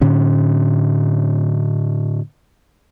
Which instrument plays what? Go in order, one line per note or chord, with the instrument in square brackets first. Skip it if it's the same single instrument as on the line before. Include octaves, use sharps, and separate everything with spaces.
[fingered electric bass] A2 D3 C#4